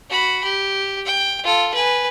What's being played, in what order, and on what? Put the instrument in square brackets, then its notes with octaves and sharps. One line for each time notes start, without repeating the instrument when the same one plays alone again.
[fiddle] F#4 B5
G4
G5
F4 A4
B4 G#5